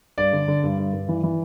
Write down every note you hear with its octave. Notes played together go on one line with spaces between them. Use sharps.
G2 D5
D3
D3
G2
G2
G2
E3
E3